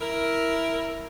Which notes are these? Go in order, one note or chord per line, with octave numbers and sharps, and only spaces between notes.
E4 A#4